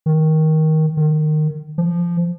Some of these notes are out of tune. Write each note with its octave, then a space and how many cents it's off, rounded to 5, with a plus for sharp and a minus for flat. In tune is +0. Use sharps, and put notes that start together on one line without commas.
D#3 +15
D#3 -20
F3 -15